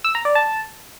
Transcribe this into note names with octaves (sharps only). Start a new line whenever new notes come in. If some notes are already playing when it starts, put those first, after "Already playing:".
E6
A#5
D5
A5